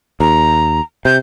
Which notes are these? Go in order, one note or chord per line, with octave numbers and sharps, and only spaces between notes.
D#2 A#5
C3 G6